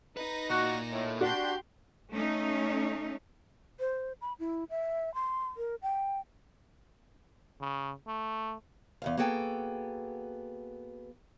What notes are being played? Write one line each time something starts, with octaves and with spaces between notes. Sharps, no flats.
D#4 B4 A#6
A#2 F#4
A2
D4 F#4 G4 C6 G6
A3 C#4 D#4
C5
B5
E4
E5
C6
A#4
G5
C#3
A3
E2 G#2 F5
A#3 B3 F#4 G#4 A4 G5